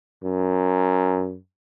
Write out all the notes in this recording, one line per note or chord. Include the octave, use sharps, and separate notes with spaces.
F#2